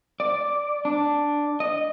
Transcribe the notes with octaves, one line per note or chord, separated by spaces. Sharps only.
D5
D4
D#5